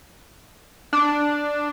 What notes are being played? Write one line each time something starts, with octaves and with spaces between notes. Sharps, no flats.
D4